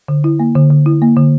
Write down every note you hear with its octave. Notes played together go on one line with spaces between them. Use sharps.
D3
E4
A#3
D3
D3
E4
A#3
D3